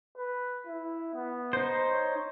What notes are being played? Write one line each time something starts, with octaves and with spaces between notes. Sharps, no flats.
B4
E4
B3
D#4 C5
C#5